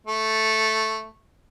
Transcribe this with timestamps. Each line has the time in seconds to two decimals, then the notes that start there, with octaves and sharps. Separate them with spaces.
0.07 A3